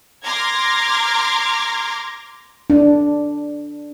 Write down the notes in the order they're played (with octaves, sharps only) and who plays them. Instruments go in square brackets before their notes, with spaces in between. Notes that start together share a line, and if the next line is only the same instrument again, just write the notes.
[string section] A#5 C6 D6 F6 G#6 A#6
[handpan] D4